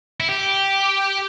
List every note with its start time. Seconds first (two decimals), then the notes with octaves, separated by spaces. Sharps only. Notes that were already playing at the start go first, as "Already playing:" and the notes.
0.20 E4
0.29 G4